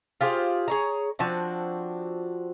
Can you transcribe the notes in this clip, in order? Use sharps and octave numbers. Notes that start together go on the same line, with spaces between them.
F4 G4 G#4 C5
G#4 C#5 A#5
F3 C4 D4 F#4